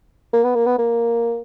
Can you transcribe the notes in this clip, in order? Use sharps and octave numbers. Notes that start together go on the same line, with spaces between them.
A#3
B3
A#3
B3
A#3